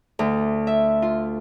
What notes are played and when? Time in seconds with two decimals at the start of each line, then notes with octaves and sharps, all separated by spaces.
0.19 D2
0.67 E5
1.02 F4